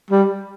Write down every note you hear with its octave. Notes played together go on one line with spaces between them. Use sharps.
G3